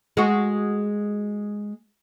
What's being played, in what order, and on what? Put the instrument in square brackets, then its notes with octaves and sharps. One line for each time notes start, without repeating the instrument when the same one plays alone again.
[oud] G#3 F#4